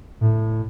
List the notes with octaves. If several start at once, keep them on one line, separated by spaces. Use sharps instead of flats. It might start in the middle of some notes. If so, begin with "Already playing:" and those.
A2